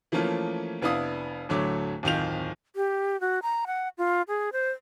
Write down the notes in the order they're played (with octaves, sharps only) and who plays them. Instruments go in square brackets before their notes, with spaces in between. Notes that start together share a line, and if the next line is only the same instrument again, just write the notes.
[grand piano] E3 F3 A3 A#3 C#4 F4
F1 B3 D4 E4 F5 D#6
D1 D3 F#3 A3 C#5 D6
D1 F2 D#3 F4 G6 F7
[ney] G4
F#4
A#5
F#5
F4
G#4
C5